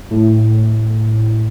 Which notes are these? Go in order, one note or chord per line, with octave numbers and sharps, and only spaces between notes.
A2